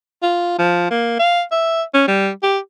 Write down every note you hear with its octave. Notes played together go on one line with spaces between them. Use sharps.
F4
F3
A#3
F5
E5
C#4
G3
G4